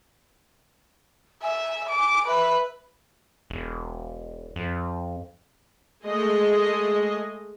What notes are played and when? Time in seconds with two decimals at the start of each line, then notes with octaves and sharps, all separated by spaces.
1.42 E5 G#5
1.89 D6
2.27 B4 E5
3.50 E1
4.56 F2
6.04 G#3 A3 G#4 D#5